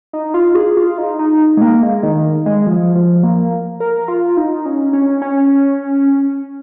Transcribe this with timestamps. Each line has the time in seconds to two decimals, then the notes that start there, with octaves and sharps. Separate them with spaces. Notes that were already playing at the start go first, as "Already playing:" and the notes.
0.13 D#4
0.34 F4
0.55 G#4
0.77 F4
0.98 D#4
1.19 D#4
1.57 G#3
1.61 A#3
1.83 G#3
2.03 D#3
2.46 G#3
2.67 F3
2.95 F3
3.23 A#3
3.80 A#4
4.08 F4
4.37 D#4
4.66 C#4
4.93 C#4
5.22 C#4